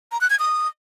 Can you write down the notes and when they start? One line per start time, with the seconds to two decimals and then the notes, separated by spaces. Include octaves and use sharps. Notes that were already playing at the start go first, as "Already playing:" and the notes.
0.12 A#5
0.21 F#6
0.30 G#6
0.39 D#6